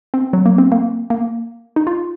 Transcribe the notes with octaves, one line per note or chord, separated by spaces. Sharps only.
C4
F#3
A#3
C4
A#3
A#3
D#4
F4